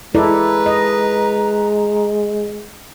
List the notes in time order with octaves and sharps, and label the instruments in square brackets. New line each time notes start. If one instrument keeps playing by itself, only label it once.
[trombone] G#3 [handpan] E4 A4 D5 [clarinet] B4 [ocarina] A#5
[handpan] D#5